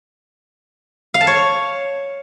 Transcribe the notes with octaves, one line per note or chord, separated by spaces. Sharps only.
F5
A5
C#5